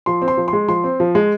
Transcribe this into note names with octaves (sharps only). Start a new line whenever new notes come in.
F3 C6
C4
C6
F3
C6
G#3
F3 C6
C4
F3
G#3